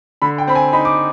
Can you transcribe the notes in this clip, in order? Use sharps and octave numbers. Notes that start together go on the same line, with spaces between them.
D3 B5
G5
C4 B5
G#5
D#4 B5
D6